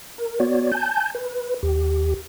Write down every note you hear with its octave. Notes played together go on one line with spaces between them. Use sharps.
A#4
B3 F#4 C#5 D5
G#5 A5 G6
B4
D#2 G4